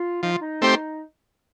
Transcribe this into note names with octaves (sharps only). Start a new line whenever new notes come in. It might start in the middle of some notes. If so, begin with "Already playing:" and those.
Already playing: F4
F3 D#4
F4
D#4
A3 C4 G4 C5